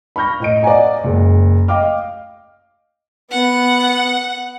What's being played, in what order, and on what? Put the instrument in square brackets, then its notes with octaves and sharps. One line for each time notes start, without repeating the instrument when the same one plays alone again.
[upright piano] B5 C#6 F6 G6 A#6
A2 D#5 D7
D5 D#5 F#5 G#5 A#5
F#1 G#3
D#5 F5 G5 D6 F6
[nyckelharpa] B3 [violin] F#5